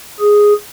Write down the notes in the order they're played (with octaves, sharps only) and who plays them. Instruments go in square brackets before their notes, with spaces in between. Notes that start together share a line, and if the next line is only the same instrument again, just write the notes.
[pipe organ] G#4